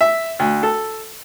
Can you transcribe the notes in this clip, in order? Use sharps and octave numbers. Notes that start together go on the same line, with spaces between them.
E5
D2
A4